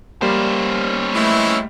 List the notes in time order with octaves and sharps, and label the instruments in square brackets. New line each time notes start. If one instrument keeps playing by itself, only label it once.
[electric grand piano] G3 A#3 [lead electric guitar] C#4 C5
[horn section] E3 G#3 E4 [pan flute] A3